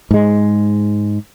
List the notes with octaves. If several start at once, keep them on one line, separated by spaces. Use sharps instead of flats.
G#2 G#3